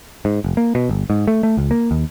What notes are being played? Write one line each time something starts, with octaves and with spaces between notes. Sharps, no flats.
G#2
F1
A#3
B2
G1
G#2
A3
A3
C#2
A#3
D#2